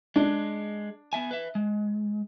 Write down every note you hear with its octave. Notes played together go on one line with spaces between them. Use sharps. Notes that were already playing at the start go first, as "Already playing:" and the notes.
G#3 D4
B3 E5 G#5
B4 E5
G#3